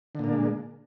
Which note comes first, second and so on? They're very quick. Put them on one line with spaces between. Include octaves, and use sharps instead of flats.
D3 A#2 A#3 D4 G#3